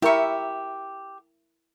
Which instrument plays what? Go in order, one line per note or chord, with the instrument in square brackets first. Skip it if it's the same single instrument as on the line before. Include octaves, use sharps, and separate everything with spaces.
[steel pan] E4 A#4 C#6 [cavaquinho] G4 E5